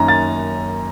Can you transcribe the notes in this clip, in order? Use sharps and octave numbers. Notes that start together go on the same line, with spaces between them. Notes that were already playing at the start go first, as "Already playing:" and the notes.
Already playing: F#2 D#3 A#3 C#4 A#5
A6